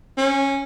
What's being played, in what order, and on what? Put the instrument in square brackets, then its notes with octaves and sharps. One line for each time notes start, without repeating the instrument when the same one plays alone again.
[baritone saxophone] C#4